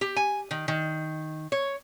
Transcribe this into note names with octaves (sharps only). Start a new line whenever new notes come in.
G4
G#5
D#3
D#3
C#5